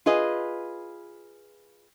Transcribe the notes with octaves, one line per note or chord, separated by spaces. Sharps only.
F4 G#4 B4 D#5